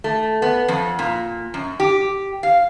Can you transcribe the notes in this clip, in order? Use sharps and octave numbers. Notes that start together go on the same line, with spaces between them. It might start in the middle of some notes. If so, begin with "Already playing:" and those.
A3
B3
F2
A#2
F#2
G4
F5